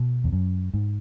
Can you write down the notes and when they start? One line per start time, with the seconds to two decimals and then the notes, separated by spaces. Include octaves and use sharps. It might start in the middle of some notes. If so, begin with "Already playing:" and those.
Already playing: B2
0.24 E2
0.33 F#2
0.74 G#2